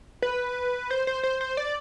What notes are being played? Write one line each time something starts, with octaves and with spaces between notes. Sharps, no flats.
B4
C5
C5
C5
C5
D5